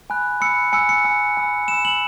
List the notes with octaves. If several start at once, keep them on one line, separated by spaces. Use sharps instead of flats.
G#5 B5 F#6
B5 E6 C#7
G#5 E6 C#7
C#7
G#5 E6
G#5 B5 E6
B5 E6 E7
F#7